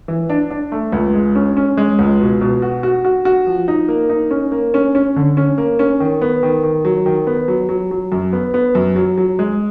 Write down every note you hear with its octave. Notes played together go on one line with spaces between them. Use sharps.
E3
D4
D4
A3
C#2
G#3
C#4
C#4
G#3
C#2
B2
B2
F#4
F#4
F#4
F#4
F3
D#4
A#3
D#4
C#4
A#3
C#4
C#4
D3
C#4
A#3
C#4
D#3
B3
D#3
D#3
F#3
D#3
B3
F#3
F#3
F#3
F#2
B3
B3
F#2
F#3
F#3
G#3